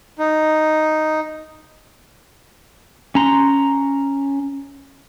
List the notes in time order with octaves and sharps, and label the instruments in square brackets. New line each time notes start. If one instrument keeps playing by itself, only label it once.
[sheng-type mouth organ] D#4
[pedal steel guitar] C#4 A#5 C6